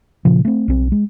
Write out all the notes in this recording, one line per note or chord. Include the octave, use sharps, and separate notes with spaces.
A#2 C#3 F3
A3 C4
B1 C4
G#3